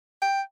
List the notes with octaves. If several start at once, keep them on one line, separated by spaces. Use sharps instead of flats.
G5